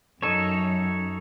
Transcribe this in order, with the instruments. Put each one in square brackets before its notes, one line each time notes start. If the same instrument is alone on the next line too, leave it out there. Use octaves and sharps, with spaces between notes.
[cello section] F#2 [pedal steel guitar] D#4 A4 C#5